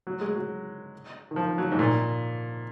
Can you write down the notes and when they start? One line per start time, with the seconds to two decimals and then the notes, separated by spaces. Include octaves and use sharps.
0.07 F#3
0.21 G#3
0.35 F#3
1.31 D#3
1.36 F3
1.58 F#3
1.72 G#2
1.79 A#2